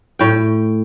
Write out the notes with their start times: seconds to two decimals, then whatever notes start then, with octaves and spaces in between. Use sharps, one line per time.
0.19 A2 G5